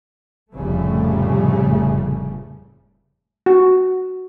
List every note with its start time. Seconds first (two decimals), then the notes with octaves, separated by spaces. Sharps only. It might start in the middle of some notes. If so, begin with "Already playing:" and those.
0.53 F1 A2 C#3 G3 A3
3.46 F#4